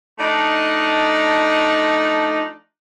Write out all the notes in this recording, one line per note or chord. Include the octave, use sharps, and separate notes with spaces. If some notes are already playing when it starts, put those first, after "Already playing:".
F3 A3 D4 D#4